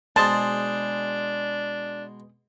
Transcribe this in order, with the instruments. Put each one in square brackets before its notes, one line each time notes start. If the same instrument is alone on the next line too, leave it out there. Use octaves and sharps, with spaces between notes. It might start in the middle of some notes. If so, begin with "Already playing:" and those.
[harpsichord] B2 G#3 C6 [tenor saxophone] D4 [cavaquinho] G#4 C5 [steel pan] A5